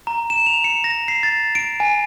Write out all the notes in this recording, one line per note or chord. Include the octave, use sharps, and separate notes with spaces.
A#5
E7
F7
C#7
A#6
C7
A6
D7
G#5